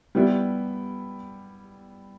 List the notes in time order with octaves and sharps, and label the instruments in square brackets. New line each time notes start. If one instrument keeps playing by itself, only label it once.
[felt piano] G3 B3 E4